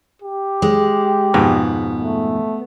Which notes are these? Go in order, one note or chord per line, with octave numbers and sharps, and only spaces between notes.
G4
G#3
F2 G#2 B2 B3
A3